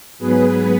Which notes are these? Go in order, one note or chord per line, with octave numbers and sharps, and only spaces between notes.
G#2 F#3 B3 G#4 B4